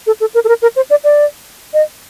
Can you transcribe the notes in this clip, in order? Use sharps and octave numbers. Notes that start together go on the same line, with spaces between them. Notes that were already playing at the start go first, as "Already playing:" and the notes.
A4
A4
A#4
A4
A#4
A#4
C5
D5
D5
D#5